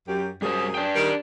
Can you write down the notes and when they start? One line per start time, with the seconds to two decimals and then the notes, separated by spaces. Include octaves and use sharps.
0.07 F#2 G4
0.42 F#2 G3 G#4 C5
0.75 D4 G5
0.96 D#3 G3 A#4